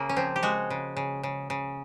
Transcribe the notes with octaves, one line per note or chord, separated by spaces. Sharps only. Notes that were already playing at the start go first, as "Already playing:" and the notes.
Already playing: C#3 A#3
C#4
F3 C4
G4
G#3 F#4
C#3
C#3
C#3
C#3